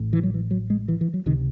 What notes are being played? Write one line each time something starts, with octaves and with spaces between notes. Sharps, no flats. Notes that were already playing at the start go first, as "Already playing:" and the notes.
Already playing: A1 A2
E3
F#3
E3
F#3
G#3
E3
E3
F#3
C#2 C3 D#3